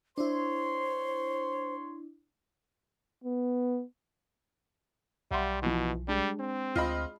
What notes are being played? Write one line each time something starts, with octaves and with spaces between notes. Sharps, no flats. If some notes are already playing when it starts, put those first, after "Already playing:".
D4 E4 C5 C#5 C6
B3
B1 G3 E5 F#5 C6
B2 E3 F3
G3 G#3 D4
C4
D2 F4 D#5 B5